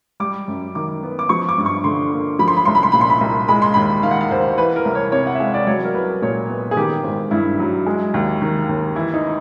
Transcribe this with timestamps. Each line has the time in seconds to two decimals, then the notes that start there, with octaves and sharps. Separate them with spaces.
0.20 G3 D6
0.48 F#2
0.75 D#3 D6
1.03 B3
1.19 D6
1.29 F3 C#6
1.49 D6
1.58 G2
1.66 C#6
1.84 D3 C6
2.11 A#3
2.39 F3 B5
2.48 C6
2.57 B5
2.65 C2 C6
2.75 B5
2.83 C6
2.92 A#2 B5
3.01 C6
3.10 B5
3.21 C2
3.48 G#3 B5
3.62 C6
3.74 D#2 B5
4.03 D#3 F5
4.11 F#5
4.21 F5
4.31 D#2 C5
4.58 E3 B4
4.76 A#4
4.85 C2
4.95 C#5
5.12 C3 C#5
5.27 F#5
5.35 E5
5.40 G#3 F5
5.54 D5
5.67 F#3 C#5
5.85 A#4
5.94 C2 B4
6.22 A#2 C#5
6.49 B3
6.71 G#4
6.76 D#3 G4
7.04 G#1
7.31 G2 E4
7.59 F#3
7.86 G#3
8.14 D#2
8.42 D#3
8.69 D#2
8.95 E3 E4
9.14 D#4